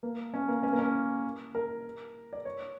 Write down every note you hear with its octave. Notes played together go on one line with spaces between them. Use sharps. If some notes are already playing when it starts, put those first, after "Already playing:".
A#3
C#4
A#3
C#4
A#3
C#4
A#4
D5
C#5